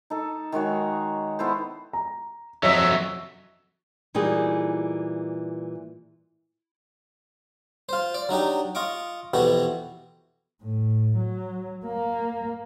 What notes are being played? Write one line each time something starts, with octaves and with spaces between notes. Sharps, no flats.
D#4 A4
D#3 G#3 F#4 C#5
B3 E4 A4 C5
A#5
F2 F#3 C#5 D#5 E5 B6
A#2 E3 G3 D#4 G#4
F4 C5
D5
F#3 D4 D#4 G4
F4 D#5 C#6 D6
F2 B2 E3 F#4 G4
A2
F#3
A#3